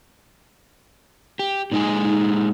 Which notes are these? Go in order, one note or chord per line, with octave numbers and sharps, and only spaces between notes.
G4
A#2 G#3 D#4 G#5
D#4